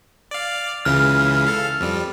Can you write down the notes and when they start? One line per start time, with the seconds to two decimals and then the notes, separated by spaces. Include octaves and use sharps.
0.31 D5 F5
0.85 C#2 C#3 E3 F6
1.47 A4 F5
1.81 F2 G3